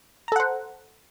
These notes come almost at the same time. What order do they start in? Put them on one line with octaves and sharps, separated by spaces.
A#5 A4 F#5 C5